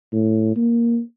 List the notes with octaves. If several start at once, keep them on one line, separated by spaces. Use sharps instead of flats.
A2
A#3